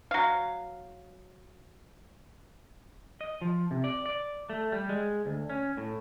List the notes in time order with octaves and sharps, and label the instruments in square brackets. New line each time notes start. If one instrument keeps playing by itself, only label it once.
[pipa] F#3 F5
[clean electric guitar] D#5
F3
C3
D5
D5
A3
G3
G#3
D2
C#4
A2